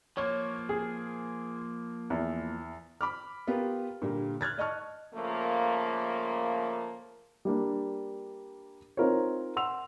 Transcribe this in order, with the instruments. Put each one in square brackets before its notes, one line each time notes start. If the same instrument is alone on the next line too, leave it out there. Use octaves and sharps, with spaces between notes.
[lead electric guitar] F3 A#3 [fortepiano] C#5
[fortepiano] G#4
E2
[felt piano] B5 D6 F6
B3 F4 G4 A#4
A#2 D3 G3 A#3
F6 F#6 G#6 A6
D5 D#5 A5 C#6 F6
[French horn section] C#3 F3 A3 A#3
[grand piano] G3 A#3 D4
C4 D#4 F4 A#4 C5 C#5
F#5 C6 E6 F7